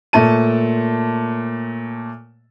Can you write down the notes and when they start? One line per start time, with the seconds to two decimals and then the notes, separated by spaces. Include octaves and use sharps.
0.13 A#2 A3 C#5 A5 D#7